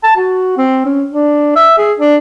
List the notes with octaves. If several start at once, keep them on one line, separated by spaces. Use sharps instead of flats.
A5
F#4
C4
C#4
D4
E5
G#4
D4